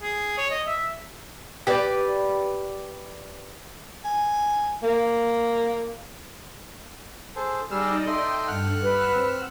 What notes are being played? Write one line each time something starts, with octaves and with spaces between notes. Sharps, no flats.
G#4
C#5
D#5
E5
G4 B4 D5
G#5
A#3
G#4 A4 C5
G3 D#4 G#4 D5 D#5 E6 F6
A4 D#5 E5 G5 C6
G2 F#5 F6 F#6
G3 B4 E6
C4